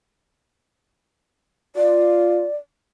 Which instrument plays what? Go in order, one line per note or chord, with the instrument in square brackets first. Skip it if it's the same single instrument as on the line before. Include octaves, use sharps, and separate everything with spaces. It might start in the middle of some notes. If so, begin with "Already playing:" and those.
[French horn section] F4 [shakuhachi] D5